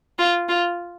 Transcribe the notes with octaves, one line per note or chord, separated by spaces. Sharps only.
F4
F4